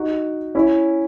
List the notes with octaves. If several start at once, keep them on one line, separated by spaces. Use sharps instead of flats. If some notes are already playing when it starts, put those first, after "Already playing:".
Already playing: D#4 F#4
C#4 E4